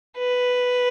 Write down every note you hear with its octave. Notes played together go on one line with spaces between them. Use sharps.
B4